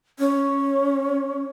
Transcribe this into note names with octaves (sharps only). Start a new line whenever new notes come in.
C#4